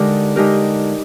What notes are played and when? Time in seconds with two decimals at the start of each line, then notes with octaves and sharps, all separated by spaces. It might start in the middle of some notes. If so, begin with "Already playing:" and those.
Already playing: D3 G#3 D#4 G4 A#4
0.36 D3 G#3 D#4 G4 A#4